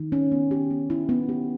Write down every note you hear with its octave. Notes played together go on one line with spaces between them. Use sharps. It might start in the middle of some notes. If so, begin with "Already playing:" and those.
Already playing: D#3
C#4
B3
G4
B3
E4
B3
G4